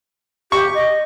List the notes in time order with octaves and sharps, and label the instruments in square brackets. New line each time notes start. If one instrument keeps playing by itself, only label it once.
[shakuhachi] G4 [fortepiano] C#6
[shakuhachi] D#5